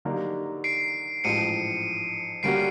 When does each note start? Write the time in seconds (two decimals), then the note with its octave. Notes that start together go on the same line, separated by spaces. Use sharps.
0.05 D3 F#3 A#3 D#4 G4
0.64 C7 D7
1.24 A1 G#2 F3 C#7 D#7
2.43 D3 G3 A#3 C#4 F#4 C7 D7